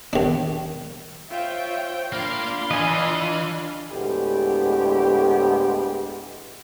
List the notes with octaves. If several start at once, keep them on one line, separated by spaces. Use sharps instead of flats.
D#2 D4
F4 C5 C#5 E5 G5
A#3 D4 F4 F5 B5 C6
E3 D#5 G#5
D2 A2 G#3 B3 G4